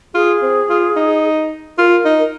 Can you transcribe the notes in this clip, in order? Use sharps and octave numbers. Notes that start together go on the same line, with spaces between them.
F4 G#4
C4
F4
D#4
F4 A#4
D#4
A#4